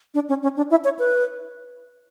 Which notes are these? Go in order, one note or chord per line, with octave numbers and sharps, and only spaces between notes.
D4
C#4
C#4
D4
E4
C#5
B4